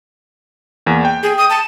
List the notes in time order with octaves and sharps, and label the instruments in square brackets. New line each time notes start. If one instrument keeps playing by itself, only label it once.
[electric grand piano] E2 A#3
G5
[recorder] G#4
D#6
A5